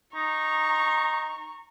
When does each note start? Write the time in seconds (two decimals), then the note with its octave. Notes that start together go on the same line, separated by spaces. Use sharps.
0.15 D#4 A#5 C#6